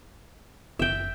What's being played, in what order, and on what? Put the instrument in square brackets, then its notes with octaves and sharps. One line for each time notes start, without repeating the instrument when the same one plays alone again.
[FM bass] F#1 [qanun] E5 G5